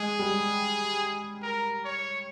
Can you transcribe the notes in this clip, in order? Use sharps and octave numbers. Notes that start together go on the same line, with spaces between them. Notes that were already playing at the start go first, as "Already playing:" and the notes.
Already playing: G#3 G#4
G3
A#4
C#5